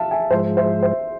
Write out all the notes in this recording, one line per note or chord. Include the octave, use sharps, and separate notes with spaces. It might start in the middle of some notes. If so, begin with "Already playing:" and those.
Already playing: E5 F5 A5
E5 G#5
G#2 F3 G#3 C5 E5
C5 E5
C5 E5